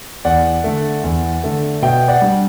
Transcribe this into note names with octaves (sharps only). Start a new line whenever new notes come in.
E2 D5 F#5
D3 A3
E2
D3 A3
B2 E5 G5
D5 F#5
G3 D4